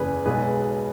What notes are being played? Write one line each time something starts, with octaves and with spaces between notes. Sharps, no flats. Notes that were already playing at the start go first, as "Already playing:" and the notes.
Already playing: F#1 E2 C#3 G#4 B4
B1 B2 G#3 B3 G#4 B4